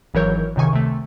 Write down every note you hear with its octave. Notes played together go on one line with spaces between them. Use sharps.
G#1 E3 F#3 A#4 C#5 G6
C#2 C3 D#3 G#5 C#6
C3 A3